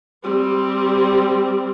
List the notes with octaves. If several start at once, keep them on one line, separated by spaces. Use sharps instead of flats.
G3 C4